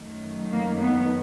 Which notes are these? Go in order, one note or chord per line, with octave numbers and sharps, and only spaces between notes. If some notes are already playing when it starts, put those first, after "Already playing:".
Already playing: F#2 D#3 F#3 A3
A#3
B3